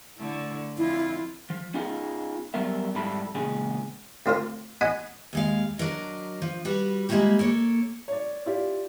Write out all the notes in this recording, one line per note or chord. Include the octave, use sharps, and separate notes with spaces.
D3 A3 E4
F2 E4 F4
F3
B3 C#4 D#4 F4 G#4
F#3 G3 B3 A#4 E5
F2 G#2 G3 E4 A4 B5
E2 A#2 C#3 G#3 G#4
D2 C4 F4 A#4
D#5 F#5 G#5 B5
D#2 G#3 F5
F#3 D4 A#4 D#5
F3
G3 F#4 B4
G3 G#3 A#3 E4 F#4 G4
A#3 A4 C#5
C#5 D5
E4 F4 G4 D5